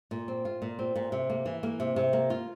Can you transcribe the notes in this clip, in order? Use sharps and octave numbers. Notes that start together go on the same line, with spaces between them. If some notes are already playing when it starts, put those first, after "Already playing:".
A#2
C4
F4
A#2
C4
A#2
C3
A#3
E3
A#3
C3
C3
A#3
F4